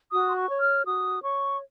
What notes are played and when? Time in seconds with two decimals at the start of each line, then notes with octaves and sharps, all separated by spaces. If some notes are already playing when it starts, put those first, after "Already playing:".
0.11 F#4 D#6
0.28 C6
0.35 C#6
0.49 C#5
0.61 F6
0.86 F#4 D#6
1.23 C#5 C#6